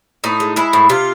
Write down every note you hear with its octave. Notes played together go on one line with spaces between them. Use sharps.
A2 D#4
G#3
G#3 E4
A2
C3 F4